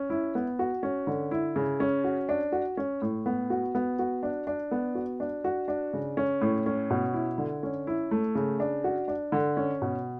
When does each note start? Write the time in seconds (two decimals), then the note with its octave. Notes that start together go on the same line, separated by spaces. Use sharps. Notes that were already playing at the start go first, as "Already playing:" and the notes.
Already playing: C#4
0.10 E4
0.35 B3
0.59 F#4
0.83 C#4
1.07 D3
1.31 E4
1.56 C#3
1.80 C#4
2.04 F#4
2.29 D4
2.52 F#4
2.77 C#4
3.02 A2
3.26 B3
3.50 F#4
3.75 B3
3.99 F#4
4.23 D4
4.47 D4
4.71 B3
4.95 F#4
5.20 D4
5.44 F#4
5.68 D4
5.93 C#3
6.17 C#4
6.41 A2
6.66 C#4
6.90 B2
7.14 E4
7.38 D3
7.63 C#4
7.87 E4
8.11 A3
8.35 C#3
8.60 D4
8.84 F#4
9.08 D4
9.32 D3
9.57 C#4
9.82 B2